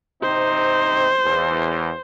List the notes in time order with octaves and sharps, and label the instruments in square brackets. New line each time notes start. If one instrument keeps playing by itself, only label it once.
[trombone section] C3 C4 D#4 [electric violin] C5
[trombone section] E2